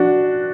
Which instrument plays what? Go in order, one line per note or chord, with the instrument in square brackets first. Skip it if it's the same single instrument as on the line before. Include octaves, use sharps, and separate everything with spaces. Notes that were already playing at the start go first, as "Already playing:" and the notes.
Already playing: [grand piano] D4 F#4